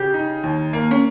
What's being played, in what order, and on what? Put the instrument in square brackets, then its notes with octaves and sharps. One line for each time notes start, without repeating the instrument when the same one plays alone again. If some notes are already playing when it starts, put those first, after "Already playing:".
Already playing: [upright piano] C#3 [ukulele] G4
[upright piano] D#4
D#2
A#3
[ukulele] C#4